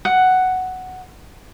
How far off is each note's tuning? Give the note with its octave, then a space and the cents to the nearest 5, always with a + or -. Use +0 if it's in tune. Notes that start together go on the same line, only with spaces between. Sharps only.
F#5 +5